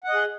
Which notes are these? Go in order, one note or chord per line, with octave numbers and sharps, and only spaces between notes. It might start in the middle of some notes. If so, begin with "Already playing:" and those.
G#4 D#5 F#5